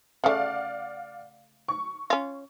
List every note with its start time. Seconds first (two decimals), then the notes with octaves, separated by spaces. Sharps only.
0.24 C#3 A3 D5 F5 F#5
1.68 C#6
2.10 C#4 F4